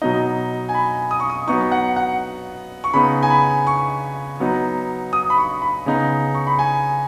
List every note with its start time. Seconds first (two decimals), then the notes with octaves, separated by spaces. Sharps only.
0.02 B2 F#3 B3 D#4 D#5
0.69 G#5
0.74 B5
1.11 D#6
1.20 C#6
1.30 D#6
1.48 F#3 B3 D#4 C#6
1.72 F#5
1.96 F#5
2.84 C#6
2.93 C#3 B3 D#4 B5
3.23 G#5
3.30 B5
3.67 C#6
4.40 F#3 B3 D#4
5.13 D#6
5.30 B5
5.38 C#6
5.62 B5
5.86 C#3 B3 D#4
6.34 C#6
6.47 B5
6.59 G#5